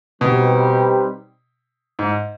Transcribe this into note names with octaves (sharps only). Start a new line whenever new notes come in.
B2 G3 C4 D#4 G4 B4
G#2